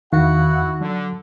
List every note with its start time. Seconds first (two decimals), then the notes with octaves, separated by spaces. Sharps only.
0.13 E2 D#3 E4 F#4 F5 F#5
0.81 D3 F#3